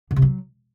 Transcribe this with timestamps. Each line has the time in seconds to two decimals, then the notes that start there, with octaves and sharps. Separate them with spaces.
0.11 D3
0.16 C3
0.22 F#3